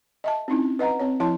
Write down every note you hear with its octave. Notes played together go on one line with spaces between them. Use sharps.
D#5 E5 A5
C4 C#4 D#4 E4
B4 D#5 F#5 A#5
C4 C#5
F3 E4 C#5 A5 C6